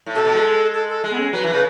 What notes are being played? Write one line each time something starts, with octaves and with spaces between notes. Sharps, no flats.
A2
B2 A4
B2
G#3
A4
A4
G#3
B3
C#4
F#3 B4
E3
C#3 B4